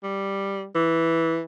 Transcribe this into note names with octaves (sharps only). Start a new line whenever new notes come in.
G3
E3